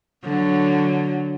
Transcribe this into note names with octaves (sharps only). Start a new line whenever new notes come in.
D3 F#3